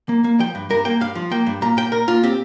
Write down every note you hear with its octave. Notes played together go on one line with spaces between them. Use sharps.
A#3
A#3
F3 G5
G2
G2 A#4
A#3 G5
G2 F5
F3
A#3 G5
G2
A#2 A#5
A#2 G5
A#2 A#4
A#2 F4
C4 G4